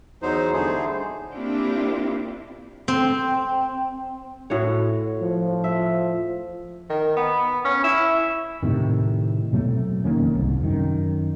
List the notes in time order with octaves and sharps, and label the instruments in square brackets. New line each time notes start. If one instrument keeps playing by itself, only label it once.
[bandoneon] E2 F#3 D#4 C5
D3 G3 A3 D#4 G#4 C5
[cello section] A#3 C4 D4 E4 F4 G4
[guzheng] C4
[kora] A2 F#4 C#5
[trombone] F3
[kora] E5
[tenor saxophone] D#3
B3
C#4
E4
[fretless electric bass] A2 C3 D#3
B2 F#3 A3 C4
F1 D#3 A#3 C#4
C2 G#2
F#2 D#3